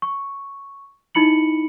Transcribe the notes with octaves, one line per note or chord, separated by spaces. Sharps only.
C#6
D#4 E4 B5 C#7 F#7